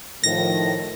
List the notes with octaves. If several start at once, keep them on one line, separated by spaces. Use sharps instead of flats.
A2 D#3 F3 A#6